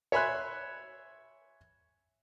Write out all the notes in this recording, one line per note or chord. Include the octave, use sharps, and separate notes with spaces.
C#5 E5 G#5 B5 C6 F#6